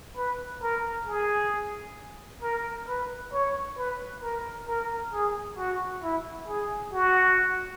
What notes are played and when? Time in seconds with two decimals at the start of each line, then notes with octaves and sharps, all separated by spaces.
0.17 B4
0.62 A#4
1.07 G#4
2.42 A#4
2.88 B4
3.33 C#5
3.77 B4
4.23 A#4
4.67 A#4
5.13 G#4
5.58 F#4
6.03 E4
6.48 G#4
6.93 F#4